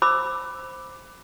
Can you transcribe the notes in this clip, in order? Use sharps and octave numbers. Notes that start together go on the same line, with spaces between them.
C5 B5 D6 E6